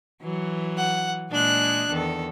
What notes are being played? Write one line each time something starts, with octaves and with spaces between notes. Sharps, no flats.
E3 F#3
F#5
A#2 G#3 D4 G#4 F#6
E2 D#3 A4